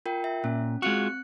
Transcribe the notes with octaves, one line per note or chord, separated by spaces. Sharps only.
F4 A#4 G5
E5
A#2 C#4
G#3 C4 F4 F#4 F#6 C#7